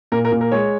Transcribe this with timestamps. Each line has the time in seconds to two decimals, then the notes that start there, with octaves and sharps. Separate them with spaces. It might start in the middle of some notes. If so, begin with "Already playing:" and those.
0.12 A#2 A#4
0.25 A#4
0.32 A#2
0.41 A#4
0.51 G#3 C#5